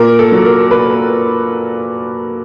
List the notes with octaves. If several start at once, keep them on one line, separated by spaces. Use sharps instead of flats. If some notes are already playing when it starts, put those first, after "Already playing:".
Already playing: A#2 A#4
A4
F#3
A#4
A#2 B4